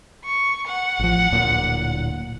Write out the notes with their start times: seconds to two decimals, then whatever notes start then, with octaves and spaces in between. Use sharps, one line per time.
0.25 C#6
0.67 F#5
0.99 A1 F3
1.32 D1 A#2